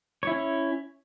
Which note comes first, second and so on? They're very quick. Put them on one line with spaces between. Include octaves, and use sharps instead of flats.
C#5 E4 C#4